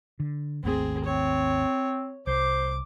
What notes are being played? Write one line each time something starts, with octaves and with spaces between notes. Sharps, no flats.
D3
G#1 D#2 A3 C4 G#4
C4 C#5
C2 C5 D6